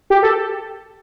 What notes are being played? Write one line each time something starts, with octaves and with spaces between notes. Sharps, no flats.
G4
A4